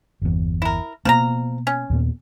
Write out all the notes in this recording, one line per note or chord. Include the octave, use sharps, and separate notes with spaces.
G1 E2
E4 A#4
B2 F3 A#3 B3 B4 A#5
C#4
D#2 A#2 B3